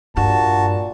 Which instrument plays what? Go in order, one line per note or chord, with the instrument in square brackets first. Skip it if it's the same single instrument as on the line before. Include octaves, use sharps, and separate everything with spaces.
[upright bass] G2 [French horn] A#2 [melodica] F#4 [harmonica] A5